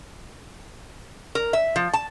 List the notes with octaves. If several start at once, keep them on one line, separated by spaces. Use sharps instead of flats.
A#4
E5
F3
A5